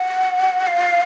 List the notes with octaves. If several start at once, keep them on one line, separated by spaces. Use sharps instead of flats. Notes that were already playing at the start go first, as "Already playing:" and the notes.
Already playing: F#5
F5